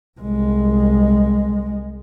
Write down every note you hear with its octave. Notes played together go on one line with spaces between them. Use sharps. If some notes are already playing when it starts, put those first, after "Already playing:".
C2 G#3